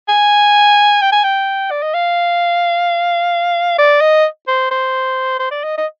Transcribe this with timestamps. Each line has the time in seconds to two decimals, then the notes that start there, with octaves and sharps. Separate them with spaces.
0.09 G#5
1.01 G5
1.12 G#5
1.23 G5
1.71 D5
1.83 D#5
1.94 F5
3.78 D5
4.01 D#5
4.48 C5
4.71 C5
5.39 C5
5.51 D5
5.64 D#5
5.77 D#5